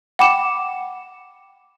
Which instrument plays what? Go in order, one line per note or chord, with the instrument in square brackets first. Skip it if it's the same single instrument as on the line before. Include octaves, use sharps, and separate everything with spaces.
[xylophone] F#5 G5 B5 D6 C#7 E7